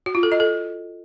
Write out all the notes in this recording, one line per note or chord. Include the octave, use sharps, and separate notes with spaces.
F#4
F4
A4
D#5
A4